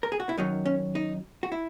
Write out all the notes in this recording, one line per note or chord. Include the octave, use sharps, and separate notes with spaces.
A#4
G#4
F#4
E4
F#2 D#3 F#3 D#4
C#4
D#4
F#4
E4